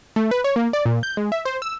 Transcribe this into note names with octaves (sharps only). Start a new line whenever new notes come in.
A3
B4
C#5
A#3
D5
A#2
G6
G#3
E5
C5
E6